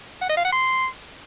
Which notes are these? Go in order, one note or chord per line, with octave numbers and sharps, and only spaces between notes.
F#5
D#5
F5
F#5
C6